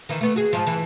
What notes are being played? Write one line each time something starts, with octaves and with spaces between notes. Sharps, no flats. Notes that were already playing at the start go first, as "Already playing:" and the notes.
D#3 E3
A3 B3
F#4 G#4
G#2 F3
E3